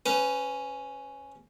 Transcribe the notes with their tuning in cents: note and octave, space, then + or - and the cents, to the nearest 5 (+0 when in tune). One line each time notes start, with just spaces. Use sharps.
C#4 +0 B4 +30